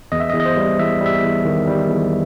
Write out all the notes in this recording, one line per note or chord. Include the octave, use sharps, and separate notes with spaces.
E2 D#5
E5
D#5
E2
D#5
C5
G3
E2 E5
G3
E5
E2
D#3
G3
E2